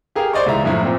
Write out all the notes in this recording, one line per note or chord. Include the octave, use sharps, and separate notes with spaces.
G4 G#4 A#4 F5
C5 D5 D#5 C#6
C#2 G#2 E3 G#3 E5 A#5
F#2 A2 F3 E4
A#2 C4